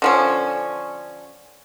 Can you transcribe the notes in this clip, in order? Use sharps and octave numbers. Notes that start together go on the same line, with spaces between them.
D3 F3 C#4